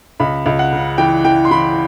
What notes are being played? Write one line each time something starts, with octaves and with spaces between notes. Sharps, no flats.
C#2 B5
C#2
F#5
C#3
E3 G5
E3 G5
C6
E3 B5